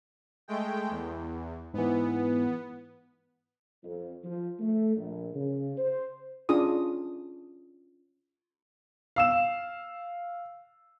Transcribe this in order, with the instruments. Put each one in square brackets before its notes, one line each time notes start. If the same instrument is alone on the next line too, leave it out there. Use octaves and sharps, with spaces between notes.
[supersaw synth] G#3 A3 G5
E2
[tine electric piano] G#2 E3 [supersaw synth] B3
[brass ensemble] F2
F3
A3
A#1
C#3
C5
[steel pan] C#4 D4 F4 G#4 D#6
[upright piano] F5 E6 E7